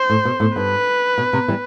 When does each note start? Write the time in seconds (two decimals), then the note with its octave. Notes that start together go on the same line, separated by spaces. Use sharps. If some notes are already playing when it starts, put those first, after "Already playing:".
Already playing: C5
0.10 A2
0.25 B2
0.40 A2
0.56 G2 B4
1.18 B2
1.33 C3
1.48 E3 G3